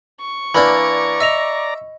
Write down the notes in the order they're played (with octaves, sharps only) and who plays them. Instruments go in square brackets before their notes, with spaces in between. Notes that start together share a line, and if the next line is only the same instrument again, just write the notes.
[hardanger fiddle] C#6
[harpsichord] E3 A#3 D4 [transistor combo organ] D5 A#5 [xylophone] B5
[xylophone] D#5 A#6 F7 [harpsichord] E5